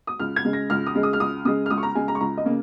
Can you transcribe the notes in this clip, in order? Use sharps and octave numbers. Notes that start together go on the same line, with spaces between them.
D#6
C#2 F6
G#6
C#3 G#3
A#6
C#2 F6
D#6
C#3 G#3
D#6
F6
C#2 D#6
C#3 G#3 D#6
F6
C#2 D#6
C#6
A#5
C#3 G#3 G#5
A#5
C#6
C#2 A#5
D#5
C#3 A#3